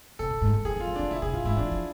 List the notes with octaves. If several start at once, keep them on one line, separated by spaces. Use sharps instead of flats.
C3 A4
A2
G#2
D3
E3 G#4
G#3
F4
F3
E3 D4
D3 E4
C3 G#4
A2 F4
G#2 E4
E3 D4
F3